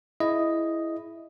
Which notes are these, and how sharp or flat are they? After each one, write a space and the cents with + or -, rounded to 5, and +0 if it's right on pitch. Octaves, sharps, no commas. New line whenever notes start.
E4 +0 G#4 +15 D#5 +0